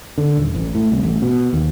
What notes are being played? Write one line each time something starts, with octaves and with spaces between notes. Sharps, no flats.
D3
D#1
A1
A2
C2
A1
B2
D#2